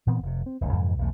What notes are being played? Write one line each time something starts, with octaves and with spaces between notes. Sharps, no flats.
A#2 E3 B3 C4
F1 C3
C4
F1 C#2 C#3
F2 G#2 C3 E3
B1 E2 A3